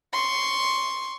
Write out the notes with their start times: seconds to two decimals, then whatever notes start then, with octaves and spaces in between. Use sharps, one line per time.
0.13 C6 C#6